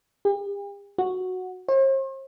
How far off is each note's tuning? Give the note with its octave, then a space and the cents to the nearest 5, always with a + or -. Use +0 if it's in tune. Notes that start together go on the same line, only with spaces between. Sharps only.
G4 +45
F#4 -5
C5 +45